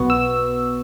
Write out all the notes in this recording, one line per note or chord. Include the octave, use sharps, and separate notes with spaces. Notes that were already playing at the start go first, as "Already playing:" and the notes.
Already playing: B1 B2 B3 C#6
E6